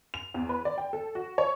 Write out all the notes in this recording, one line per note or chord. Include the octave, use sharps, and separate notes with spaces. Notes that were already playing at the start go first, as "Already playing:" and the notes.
F7
E2
B4
D5
G5
A4
F#4
C#5